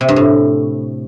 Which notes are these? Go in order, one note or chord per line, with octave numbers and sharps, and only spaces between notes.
C3
G2
A2